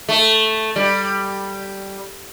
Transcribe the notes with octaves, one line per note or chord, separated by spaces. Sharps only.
A3
G3